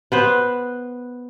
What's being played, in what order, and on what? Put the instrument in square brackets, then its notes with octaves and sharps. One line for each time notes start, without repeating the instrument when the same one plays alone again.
[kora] B3 B4 C5